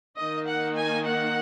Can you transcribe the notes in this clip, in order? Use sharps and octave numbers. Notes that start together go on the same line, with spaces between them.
D#3 A#3 D#4 D#5
F#5
G#5
F#5